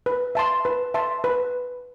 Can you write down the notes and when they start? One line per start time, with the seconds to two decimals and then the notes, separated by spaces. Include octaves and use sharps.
0.06 B4
0.35 E5 A5 C6
0.65 B4
0.94 E5 A5 C6
1.24 B4